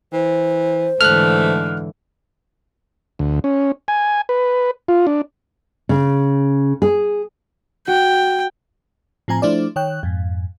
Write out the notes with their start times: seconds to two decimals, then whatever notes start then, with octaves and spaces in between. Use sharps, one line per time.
0.13 E3 C5
1.01 G#2 D3 E3 A3 F6 F#6
3.19 D2
3.44 C#4
3.88 G#5
4.29 B4
4.88 F4
5.07 D4
5.89 C#3
6.82 G#4
7.87 F#4 G5
9.28 A2 F3 C4 G#5 A#5
9.42 F3 A3 D4 E4 C5 D5
9.76 D#3 C#5 G5 F#6
10.03 F2 G#2